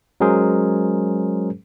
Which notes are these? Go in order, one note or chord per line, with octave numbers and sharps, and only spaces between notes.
F#3 G#3 C#4 G#4 A#4 C5